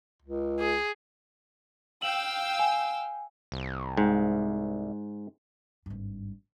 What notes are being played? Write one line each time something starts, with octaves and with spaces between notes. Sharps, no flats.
C#2
G#4
F5 G5 E6 F#7
G#5
C2
G#2
G#1 G2